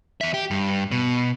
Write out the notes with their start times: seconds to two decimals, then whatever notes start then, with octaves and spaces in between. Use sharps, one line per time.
0.21 E2 E5
0.34 G4
0.51 G2
0.92 B2